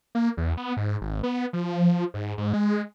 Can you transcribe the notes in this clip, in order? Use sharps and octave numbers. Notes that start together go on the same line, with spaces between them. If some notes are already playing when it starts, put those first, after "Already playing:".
A#3
E2
B3
G#2
G#1
B3
F3
G#2
G#2
G#3